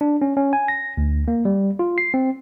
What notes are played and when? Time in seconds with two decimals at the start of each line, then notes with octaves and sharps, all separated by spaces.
0.01 D4
0.22 C#4
0.37 C#4
0.53 G#5
0.68 A#6
0.97 D2
1.28 A#3
1.45 G3
1.79 F4
1.98 C7
2.14 C4